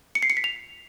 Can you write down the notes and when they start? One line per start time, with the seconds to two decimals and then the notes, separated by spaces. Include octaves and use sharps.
0.15 C#7
0.23 C7
0.30 C#7
0.37 B6
0.44 F7